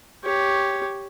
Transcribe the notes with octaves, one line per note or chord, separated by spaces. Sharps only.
G4 C#5